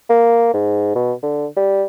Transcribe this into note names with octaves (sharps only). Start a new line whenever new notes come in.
A#3
G#2
B2
D3
G3